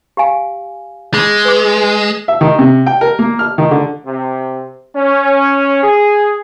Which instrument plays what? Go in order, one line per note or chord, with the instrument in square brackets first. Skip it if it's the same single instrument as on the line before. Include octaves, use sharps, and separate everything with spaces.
[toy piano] G4 F5 G#5
[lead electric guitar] G#3 [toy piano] G#4
[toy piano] B4 D6
[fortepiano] E5
D#3
C3
G5
A#4
A#3
F6
D#3
D3
[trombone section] C3
C#4
G#4